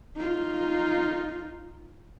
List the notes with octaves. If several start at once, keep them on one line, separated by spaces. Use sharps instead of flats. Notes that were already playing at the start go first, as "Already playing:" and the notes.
D#4 F4